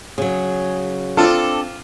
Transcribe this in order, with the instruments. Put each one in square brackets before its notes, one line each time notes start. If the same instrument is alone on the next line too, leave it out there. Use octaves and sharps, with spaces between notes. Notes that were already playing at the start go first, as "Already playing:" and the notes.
[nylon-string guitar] C#3 F#3 [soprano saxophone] G#4
[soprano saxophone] C4 [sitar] D4 A4 [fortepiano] F4